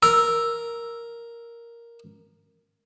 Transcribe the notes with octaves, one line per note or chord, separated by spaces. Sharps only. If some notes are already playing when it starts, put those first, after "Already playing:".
A#4 E6